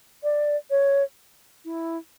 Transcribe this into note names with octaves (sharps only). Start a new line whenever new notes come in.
D5
C#5
E4